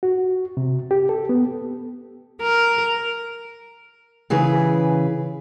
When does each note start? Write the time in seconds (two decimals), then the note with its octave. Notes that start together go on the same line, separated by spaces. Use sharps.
0.03 F#4
0.57 C3
0.91 G4
1.09 A4
1.29 B3
2.42 A#4
4.30 C#3 E3 G#4 B4